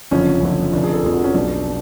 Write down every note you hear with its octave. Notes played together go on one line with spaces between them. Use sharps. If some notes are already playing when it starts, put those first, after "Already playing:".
F#1 F2 D3 F3 C#4
F#1 F2 D3 F3
F1 F2 F3 D4
G#4
A4
F1 F2 F3 G#4
F#4
C#4
B1 B2 D4